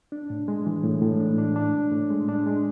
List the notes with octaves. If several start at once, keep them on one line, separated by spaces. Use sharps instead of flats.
D4
A2
G#3
E3
A2
A2
D4
D4
D4
A2
A2
G#3
D4
G#3